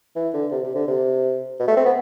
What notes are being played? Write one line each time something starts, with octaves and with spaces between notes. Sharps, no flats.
E3
D3
C3
C3
D3
C3
B2
A3
C4
B3